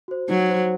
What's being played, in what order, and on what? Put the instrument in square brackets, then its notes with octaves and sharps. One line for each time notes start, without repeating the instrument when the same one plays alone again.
[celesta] F#4 C5
[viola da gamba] F#3 [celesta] D#4
[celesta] F#4 C5